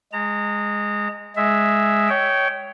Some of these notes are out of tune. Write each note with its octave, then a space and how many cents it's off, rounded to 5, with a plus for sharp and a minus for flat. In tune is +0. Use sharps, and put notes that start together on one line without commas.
G#3 -5 A#5 -35
G#3 +0 E5 +0
C#5 +10 G5 -20